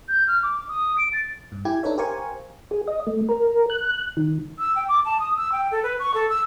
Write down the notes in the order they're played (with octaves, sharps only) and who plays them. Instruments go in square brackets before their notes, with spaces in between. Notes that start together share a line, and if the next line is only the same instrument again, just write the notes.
[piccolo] G6
F6
D6
D#6
D7
A6
[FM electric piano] G2
E4 G4 G5 G#5 G#6
D4 D#4 A4 B4 C#5 E5
G4 A#4 C5 F5 G#5 C#6
[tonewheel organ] G#4
D#5
A3
A#4
F#6
D#3
[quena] E6
G5
D6
A5
D#6
E6
G5
A4
B4
C#6
A4
E6